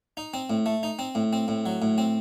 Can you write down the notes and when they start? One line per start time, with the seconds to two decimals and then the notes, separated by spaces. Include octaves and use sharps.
0.17 D#4
0.34 C4
0.50 A2
0.66 A3
0.83 D#4
0.99 C4
1.15 A2
1.33 C4
1.48 A2
1.66 F#3
1.82 A2
1.98 C4